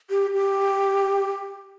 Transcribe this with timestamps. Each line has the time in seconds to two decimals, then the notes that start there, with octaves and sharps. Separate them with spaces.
0.10 G4
0.34 G4